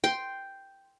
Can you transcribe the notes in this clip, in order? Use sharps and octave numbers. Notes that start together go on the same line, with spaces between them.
G5 C6